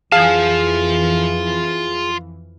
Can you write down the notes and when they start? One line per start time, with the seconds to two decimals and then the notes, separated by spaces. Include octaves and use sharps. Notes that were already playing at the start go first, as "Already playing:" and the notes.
0.12 F2 E3 F4 G#4 F5 A5